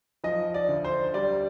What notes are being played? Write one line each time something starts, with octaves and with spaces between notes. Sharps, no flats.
F3 D#5
D5
D2
C5
G3 D5